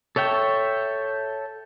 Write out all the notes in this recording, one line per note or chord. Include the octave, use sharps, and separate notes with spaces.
A4 C#5 E5 G5